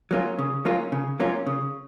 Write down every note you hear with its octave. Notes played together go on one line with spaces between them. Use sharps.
F#3 A#3 C#4 F4
C#3
F#3 A#3 C#4 F4
C#3
F#3 A#3 C#4 F4
C#3